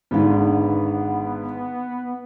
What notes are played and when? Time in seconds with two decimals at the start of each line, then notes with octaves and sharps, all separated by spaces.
0.11 G#1 G#2 D3 B3